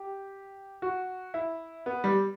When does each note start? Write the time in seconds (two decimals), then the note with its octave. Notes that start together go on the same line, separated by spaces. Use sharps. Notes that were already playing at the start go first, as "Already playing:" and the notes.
Already playing: G4
0.82 F#4
1.34 E4
1.86 B3
2.04 G3